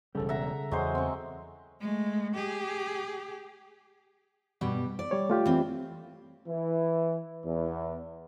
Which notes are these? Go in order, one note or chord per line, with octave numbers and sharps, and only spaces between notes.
E1 C#3 G3 A4
E5 F#5 A#5
E2 F#3 G#3 C5
C4 C#6
G#3 A3
G4 G#4
G2 B2 G3
D5
G3 C#5
A3 F4 G4
E3 C4
E3
E2